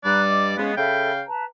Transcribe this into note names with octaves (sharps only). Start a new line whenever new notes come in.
G2 G3 D5 A#5 B5 F#6
D#5 D6
G#3 B3 C#4 F5 B5
C#3 A4 E5 F5 G5 B5
B4 A5 A#5